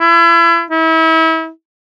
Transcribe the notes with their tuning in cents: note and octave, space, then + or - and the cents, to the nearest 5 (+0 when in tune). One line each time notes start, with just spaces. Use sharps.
E4 +35
E4 -35